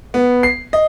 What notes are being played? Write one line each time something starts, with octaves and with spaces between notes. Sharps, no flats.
B3
C7
D#5